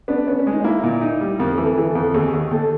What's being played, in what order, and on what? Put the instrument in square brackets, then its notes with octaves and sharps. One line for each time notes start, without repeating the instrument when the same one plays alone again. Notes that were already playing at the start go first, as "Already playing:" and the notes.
[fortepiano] B3 [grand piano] D4
[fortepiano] B3 [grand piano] C#4
[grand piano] C#4
[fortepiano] G#3
[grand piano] D#4
[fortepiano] A#3 [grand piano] E4
[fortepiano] A#2
D#4
G3
[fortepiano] F2 [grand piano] A#4
[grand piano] A4
[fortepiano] E3
[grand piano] A4
[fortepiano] E3 [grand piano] G#4
[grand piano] A4
[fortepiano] F2
[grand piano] A4
[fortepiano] D#2 [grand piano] G#4
[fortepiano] D#2
[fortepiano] D#2 [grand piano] A4